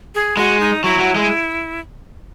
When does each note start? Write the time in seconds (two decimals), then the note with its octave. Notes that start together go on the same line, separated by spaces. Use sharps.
0.15 G#4
0.37 G#3 F#4
0.60 D#4
0.84 F#3 E4
0.99 F#3
1.16 G#3